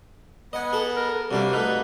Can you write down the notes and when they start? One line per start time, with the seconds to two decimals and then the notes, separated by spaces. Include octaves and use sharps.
0.53 B3 B4 D#5 F#5 G#5
0.73 G#4 A4 F#5
0.96 A#4
1.31 C3 G3 A#3 D4 F#4 F5
1.53 A3 D#4 B4